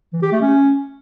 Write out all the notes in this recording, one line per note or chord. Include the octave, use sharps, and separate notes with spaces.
E3
G4
A3
C#4